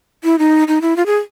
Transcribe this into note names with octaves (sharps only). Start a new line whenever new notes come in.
E4
D#4
D#4
E4
F4
G#4